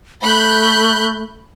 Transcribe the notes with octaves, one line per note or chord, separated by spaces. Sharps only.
A3 B5 F#6 G6